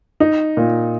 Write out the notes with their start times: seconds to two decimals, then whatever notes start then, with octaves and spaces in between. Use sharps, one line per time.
0.20 D#4
0.57 A#2